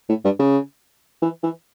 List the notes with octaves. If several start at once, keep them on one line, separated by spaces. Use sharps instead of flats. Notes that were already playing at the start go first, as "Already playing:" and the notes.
A2
G2
C#3
E3
E3